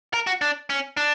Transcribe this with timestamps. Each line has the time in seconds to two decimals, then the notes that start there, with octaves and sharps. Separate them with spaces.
0.14 A#4
0.27 F#4
0.41 D4
0.70 C#4
0.97 D4